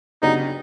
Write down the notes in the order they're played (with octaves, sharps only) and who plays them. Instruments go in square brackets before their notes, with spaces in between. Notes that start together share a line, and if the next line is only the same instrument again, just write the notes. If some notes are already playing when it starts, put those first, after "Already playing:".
[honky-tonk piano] C#3 F#3 B3 D4 G4 [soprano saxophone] D#4